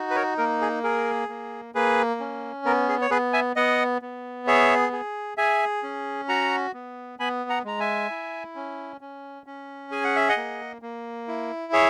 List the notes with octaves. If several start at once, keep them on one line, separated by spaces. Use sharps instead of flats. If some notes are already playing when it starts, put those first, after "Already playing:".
Already playing: D#4 F#4
B4
A#4 C#5
A#3 A#4
G#4
G#4 A#4
A#3
A#3 G#4 B4
C#4
B3 A#4
G#4
C#5
B3 G#4 B4
E5 G#5
B3 D#5 F#5
B3
G#4 C#5 E5
G#4
G#4 E5 G#5
C#4
F#4 F#5 A#5
B3
B3 G#5 B5
F#5 A#5
G#3 A#5
E5 G#5
E4
C#4
C#4
C#4
G#4 G#5
F#5
E5
D#5 F#5
A#3
A#3
E4
G#4 C#5 E5